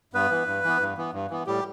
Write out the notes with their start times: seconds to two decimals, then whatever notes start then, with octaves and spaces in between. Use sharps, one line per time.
0.14 G2 B3 B4
0.30 E3 B3
0.47 G2
0.64 E3 B3
0.81 G2
0.97 E3 B3
1.13 G2
1.30 E3 B3
1.47 A2 G3 G4